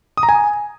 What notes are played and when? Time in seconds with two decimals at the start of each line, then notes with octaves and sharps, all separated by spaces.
0.17 D#6
0.23 A#5
0.29 G#5